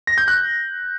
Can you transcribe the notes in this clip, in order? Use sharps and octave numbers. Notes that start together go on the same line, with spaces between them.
A#6
G6
F#6